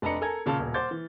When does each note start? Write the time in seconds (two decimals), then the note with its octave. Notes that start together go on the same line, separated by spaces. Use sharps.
0.02 F1 D4 B4 D#5 A#5 C#7
0.21 A4 A#4 G#5 A#5 G#6
0.46 A#2 C#3 F4 A5 F6
0.59 D#1 B2
0.74 C5 F#5 C6 D6 G6 A6
0.91 E3